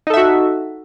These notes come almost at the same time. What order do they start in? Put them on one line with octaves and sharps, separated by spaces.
D#4 A4 E5 F#4